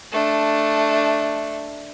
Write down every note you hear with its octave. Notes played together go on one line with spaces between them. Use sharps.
A3 D4